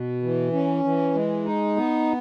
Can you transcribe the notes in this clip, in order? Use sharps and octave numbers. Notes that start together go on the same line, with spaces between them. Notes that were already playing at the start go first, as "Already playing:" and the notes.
Already playing: B2
E3
C#4
E3
G#3
D#4
B3